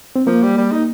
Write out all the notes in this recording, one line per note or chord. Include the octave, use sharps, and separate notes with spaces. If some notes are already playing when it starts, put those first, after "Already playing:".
C4
F3 A#3
G3
G3
D#4